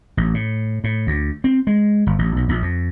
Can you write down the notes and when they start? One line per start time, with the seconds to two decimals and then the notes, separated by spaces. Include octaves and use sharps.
0.17 A1
0.34 A2
0.84 A2
1.07 D2
1.44 C4
1.67 G#3
2.07 G1
2.19 A1
2.36 B1
2.49 A#1
2.62 F2